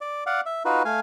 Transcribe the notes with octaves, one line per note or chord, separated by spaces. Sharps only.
D5
D5 F5 F#5
E5
D#4 F4 F#4 B4
A3 F5 G#5